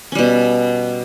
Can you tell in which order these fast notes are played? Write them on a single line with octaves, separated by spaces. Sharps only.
C#4 G3 B2